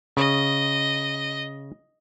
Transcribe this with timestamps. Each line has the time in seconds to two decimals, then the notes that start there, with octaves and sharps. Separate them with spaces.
0.17 C#3 D#5